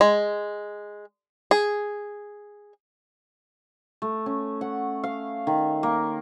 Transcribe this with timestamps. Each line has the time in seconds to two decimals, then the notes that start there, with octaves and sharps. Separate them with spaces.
0.01 G#3
1.51 G#4
4.02 A3
4.26 C#4
4.61 F#5
5.04 F5
5.47 D#3
5.83 A#3